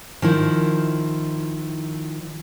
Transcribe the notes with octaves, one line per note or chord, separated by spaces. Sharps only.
D#3 F3 E4